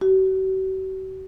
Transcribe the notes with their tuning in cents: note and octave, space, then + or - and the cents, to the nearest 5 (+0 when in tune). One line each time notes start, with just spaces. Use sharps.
F#4 +45